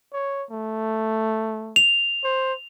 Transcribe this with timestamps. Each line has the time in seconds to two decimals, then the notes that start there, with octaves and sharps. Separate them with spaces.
0.13 C#5
0.51 A3
1.76 F7
2.24 C5